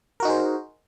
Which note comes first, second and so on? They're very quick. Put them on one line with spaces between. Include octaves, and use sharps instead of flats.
A#4 F#4 D#4 G#4 C5